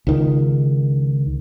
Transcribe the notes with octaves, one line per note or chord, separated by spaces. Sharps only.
C#2 D#3